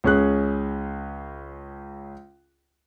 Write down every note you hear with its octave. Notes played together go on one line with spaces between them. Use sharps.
C#2 C#4 G#4 F#6